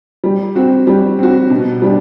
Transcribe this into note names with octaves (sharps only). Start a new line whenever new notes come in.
G3
C4 F#4
G3
C4 F#4
B2
G3 D4